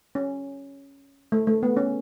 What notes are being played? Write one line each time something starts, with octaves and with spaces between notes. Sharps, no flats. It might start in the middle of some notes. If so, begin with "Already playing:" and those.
C#4
A3
A3
B3
C#4